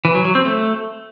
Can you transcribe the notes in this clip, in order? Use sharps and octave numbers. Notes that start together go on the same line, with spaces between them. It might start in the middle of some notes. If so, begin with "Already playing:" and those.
E3
F#3
F#3
C4
A3